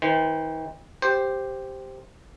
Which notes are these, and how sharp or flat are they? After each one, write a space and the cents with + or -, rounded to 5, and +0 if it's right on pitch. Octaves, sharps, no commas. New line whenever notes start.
D#3 +45 C5 -30
G4 +0 C5 +0